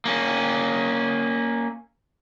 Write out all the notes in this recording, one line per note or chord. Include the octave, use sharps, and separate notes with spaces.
A#3 C#4